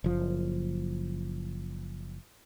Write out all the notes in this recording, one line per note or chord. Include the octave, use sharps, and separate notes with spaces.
F#1 F3